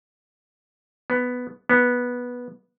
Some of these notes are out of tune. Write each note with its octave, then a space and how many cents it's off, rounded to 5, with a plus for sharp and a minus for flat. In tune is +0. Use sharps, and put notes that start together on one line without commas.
B3 +5
B3 -10